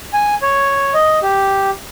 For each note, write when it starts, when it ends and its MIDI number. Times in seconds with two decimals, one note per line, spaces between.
0.13 0.35 80
0.42 0.94 73
0.94 1.19 75
1.22 1.70 67